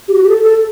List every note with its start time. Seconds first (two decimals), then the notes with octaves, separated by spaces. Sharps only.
0.08 G4
0.14 F#4
0.23 G4
0.29 A4
0.43 A4